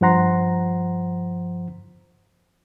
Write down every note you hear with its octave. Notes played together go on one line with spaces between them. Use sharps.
G2 F3 C5 F#5 A#5 C6